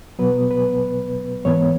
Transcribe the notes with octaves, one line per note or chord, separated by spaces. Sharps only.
B2 F#3 B3 B4
B4
G#2 E3 B3 C#5